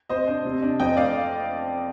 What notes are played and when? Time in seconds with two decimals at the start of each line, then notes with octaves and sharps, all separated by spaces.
0.09 C3 C5 D#5
0.27 D4
0.45 C3
0.62 D4
0.80 F2 D#5 G5
0.97 A3 D5 F5